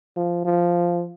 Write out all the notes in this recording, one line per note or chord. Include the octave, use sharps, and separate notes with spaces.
F3
F3